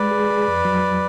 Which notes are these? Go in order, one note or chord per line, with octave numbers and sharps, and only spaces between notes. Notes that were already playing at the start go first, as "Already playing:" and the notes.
Already playing: G#3 B4 D5
G#4
G#4
F2
F#3